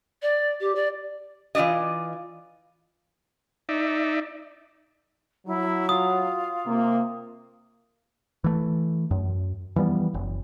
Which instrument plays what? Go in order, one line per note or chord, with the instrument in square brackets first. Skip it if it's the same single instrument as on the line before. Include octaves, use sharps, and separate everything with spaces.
[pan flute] D5
G4
D5
[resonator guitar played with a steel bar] E3 F4 G4 D5 D#5
[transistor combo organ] D#4 D5 E5
[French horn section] F#3 [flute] E4
[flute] F4 [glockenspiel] D#6
[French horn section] C3 A#3
[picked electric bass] E3 A3
F#2
E3 F3 G3 B3
F#1